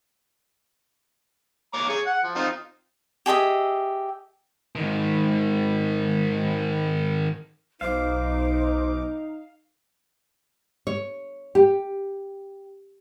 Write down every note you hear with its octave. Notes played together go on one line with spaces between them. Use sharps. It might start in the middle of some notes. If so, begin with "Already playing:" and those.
C#5 A#5 D6
G#4 C#6
F#5
F3
C4 D#4 F4
G4 G#4 D#5 E5
G#2 D#3
B1 D#4 C5 F5 D6
C#5
G4